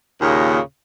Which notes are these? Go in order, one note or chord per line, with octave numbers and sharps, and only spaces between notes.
D#2 A#2 C#3